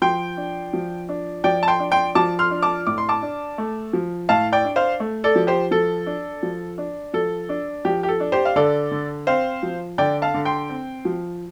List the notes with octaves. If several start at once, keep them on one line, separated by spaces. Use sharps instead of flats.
F3 G5 C6
D4
F3
D4
F3 D5 G5
A5
G5 C6
D4
G5 C6
F3 A5 D6
C6 F6
D4
A5 D6
A2 D6
C6
A5 D6
D4
A3
F3
A2 F5 A5
D5 G5
D4
C5 F5
A3
A4 D5
F3
G4 C5
F3 A4
D4
F3
D4
F3 A4
D4
F3 G4
G4
A4
D4
G4 C5
F5
D3 A4 D5
D3
C4 C5 F5
F3
D3 D5 G5
F5 A5
D3
G5 C6
C4
F3